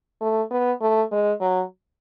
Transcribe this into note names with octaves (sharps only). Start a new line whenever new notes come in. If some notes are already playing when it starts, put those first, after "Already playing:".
A3
B3
A3
G#3
F#3